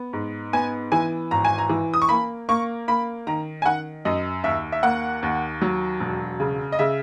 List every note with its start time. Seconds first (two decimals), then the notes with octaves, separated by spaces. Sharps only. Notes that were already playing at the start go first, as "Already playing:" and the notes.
Already playing: B3
0.13 G#2
0.53 B3 G#5
0.92 E3 G#5
1.31 G#1 A#5
1.44 G#5
1.58 A#5
1.69 E3
1.94 D#6
2.02 C#6
2.09 A#3 B5
2.49 A#3 C#6
2.88 A#3 B5
3.27 D#3 A#5
3.62 G#5
3.65 D#3 F#5
4.05 F#2 D#5
4.44 D#2 E5
4.72 E5
4.83 A#3 F#5
5.23 D#2
5.62 F#3
6.00 E1
6.40 C#3
6.72 D#5
6.79 C#3 E5